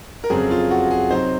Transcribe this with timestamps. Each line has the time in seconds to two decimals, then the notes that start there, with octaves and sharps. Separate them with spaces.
0.24 A#4
0.30 F2 C#3 F#3 C4 G#4
0.51 F4
0.71 F#4
0.91 G#4
1.11 C3 F#3 C4 D#4 C5